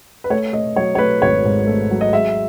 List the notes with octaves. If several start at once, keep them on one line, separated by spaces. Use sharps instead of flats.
B4
A3 C#5
A3 D#5
F#3 C#5
C#5
A3 B4
G#1 C#5
G#2
A3
F#3
D#5
G#3 E5